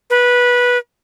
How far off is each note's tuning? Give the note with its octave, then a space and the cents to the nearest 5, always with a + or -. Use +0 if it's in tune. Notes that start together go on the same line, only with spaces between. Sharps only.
B4 -15